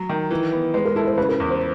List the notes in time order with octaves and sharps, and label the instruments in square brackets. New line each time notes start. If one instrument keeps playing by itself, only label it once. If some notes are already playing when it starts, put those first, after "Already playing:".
Already playing: [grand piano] F#3
D#3
E3
B3
[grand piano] G#3 [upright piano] B4
[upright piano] A#4
[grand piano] E4 [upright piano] A4
[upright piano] C5
[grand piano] C#3 [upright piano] B4
[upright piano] A#4
[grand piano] E2
[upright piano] C5